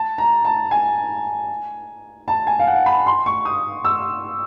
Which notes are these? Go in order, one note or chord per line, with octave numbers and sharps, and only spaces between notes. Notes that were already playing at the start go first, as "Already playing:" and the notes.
Already playing: A5
A#5
A5
G#5
A5
G#5
F5
F#5
B5
C6
C#6
D#6
E6